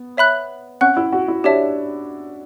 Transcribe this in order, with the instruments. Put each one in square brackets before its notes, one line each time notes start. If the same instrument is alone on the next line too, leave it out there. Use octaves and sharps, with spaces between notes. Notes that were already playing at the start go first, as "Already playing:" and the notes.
Already playing: [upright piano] B3
[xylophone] C#5 E5 B5 F#6
[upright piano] C#4 [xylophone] F#5 C#6 F#6
[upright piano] E4
F#4
E4
[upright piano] D4 [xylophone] G4 C#5 E5 A5